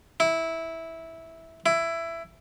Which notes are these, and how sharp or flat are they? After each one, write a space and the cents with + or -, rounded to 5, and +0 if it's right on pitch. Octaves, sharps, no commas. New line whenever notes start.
E4 -10
E4 +15